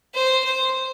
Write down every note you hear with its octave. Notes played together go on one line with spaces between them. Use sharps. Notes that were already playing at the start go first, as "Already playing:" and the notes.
C5
C5